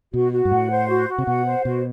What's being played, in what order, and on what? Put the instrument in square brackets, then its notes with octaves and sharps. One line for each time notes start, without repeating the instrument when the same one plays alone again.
[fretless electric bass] B2 [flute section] F#4
[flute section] F#4
[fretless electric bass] G2
[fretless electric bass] A2 [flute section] F#5
[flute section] C5
F#4
F#4
[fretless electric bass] C3
[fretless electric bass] B2 [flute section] F#5
[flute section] C5
[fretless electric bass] B2 [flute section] F#4